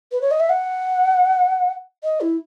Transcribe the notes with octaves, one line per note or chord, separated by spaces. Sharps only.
B4
C#5
D#5
E5
F#5
D#5
E4